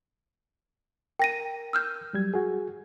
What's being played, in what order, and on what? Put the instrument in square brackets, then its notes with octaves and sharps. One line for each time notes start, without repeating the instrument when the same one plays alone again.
[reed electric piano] A#4 [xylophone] G5 A#6 D#7
[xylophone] E6 F6 G6
[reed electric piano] F#3 G3 G#6
F#4 G#4